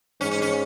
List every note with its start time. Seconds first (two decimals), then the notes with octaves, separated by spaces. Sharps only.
0.21 G#2 C#4
0.31 C#4
0.42 C#4